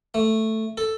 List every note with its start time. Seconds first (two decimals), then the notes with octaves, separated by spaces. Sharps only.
0.14 A3
0.78 A4